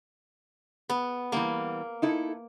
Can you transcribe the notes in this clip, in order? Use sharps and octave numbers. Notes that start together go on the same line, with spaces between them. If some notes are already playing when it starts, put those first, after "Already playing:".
B3
E3 G3 A#3 B3
D#4 E4 A4